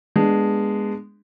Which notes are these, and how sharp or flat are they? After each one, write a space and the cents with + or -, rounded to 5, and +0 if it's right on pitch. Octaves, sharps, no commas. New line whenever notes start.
G#3 -10 B3 -15 D4 +0